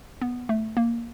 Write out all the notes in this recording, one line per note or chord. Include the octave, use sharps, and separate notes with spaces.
B3
A3
A#3